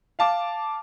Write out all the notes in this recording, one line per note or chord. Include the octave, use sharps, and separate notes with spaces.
F5 A5 D6